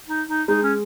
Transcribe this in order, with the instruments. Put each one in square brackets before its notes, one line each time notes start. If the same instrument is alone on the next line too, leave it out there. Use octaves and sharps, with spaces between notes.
[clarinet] D#4
D#4
[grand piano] G#3 [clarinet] D#4
[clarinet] C#4